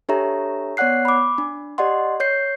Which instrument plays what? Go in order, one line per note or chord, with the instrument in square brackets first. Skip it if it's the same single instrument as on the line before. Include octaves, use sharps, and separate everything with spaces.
[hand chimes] D4 G4 A4 C#5 E5 A#5
B3 C#5 D5 F#5 F#6 C7
B5 D6
D4
G4 D5 D#5 F#5 C6
C#5 G6 C7